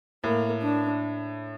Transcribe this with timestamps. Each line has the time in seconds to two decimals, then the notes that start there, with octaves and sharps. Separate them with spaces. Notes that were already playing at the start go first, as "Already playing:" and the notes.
0.24 A2 A#3
0.62 D4